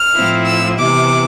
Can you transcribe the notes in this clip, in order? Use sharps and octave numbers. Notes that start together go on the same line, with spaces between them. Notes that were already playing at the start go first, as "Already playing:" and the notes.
Already playing: F6
A2 F3 C4 E4
E6
C3 E3 B3 D6